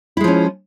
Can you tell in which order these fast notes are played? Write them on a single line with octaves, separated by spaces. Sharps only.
E4 G#3 F3 C#4